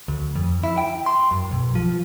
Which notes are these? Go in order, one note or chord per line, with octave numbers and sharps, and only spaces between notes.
D2
F2
E4
G5
C6
F#2
B1
F3